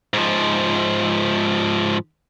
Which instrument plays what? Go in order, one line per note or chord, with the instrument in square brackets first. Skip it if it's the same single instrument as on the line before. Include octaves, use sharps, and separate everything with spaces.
[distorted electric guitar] G#2 F3